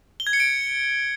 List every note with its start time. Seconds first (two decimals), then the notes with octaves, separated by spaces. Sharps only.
0.20 G7
0.27 G#6
0.33 C#7
0.40 D7